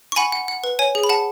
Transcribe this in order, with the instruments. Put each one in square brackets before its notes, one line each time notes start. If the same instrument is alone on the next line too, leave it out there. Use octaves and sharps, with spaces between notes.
[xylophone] C#6
F#5 G#5 B5
F#5
F#5
B4
C#5 G#5
G#4
B5
F#5 A5